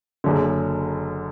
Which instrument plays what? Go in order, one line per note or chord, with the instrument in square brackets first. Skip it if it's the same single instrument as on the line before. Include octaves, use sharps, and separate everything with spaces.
[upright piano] F#1 F#2 D3